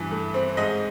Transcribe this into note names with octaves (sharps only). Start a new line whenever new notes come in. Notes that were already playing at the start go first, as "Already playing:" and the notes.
Already playing: G2 E3
A3
C4
G#2 D#5